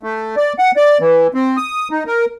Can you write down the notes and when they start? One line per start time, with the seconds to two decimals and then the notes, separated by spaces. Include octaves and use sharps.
0.03 A3
0.37 D5
0.59 F#5
0.76 D5
1.01 E3
1.34 C4
1.57 D#6
1.91 D#4
2.06 A#4